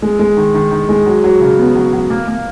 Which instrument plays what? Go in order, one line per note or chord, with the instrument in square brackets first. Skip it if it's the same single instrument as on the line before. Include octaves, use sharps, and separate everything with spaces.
[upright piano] G#3
G#3
D#3
D#3
D#3
G#3
F#3
F#3
C#3
B3
F#3
F#3
A#3
A#3